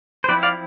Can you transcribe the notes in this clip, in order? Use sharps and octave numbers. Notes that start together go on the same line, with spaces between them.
C5
F3 C4 E4 B4 D5
D5 F5